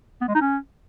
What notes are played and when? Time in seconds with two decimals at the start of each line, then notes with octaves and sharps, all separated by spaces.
0.21 B3
0.28 G#3
0.35 D#4
0.41 C#4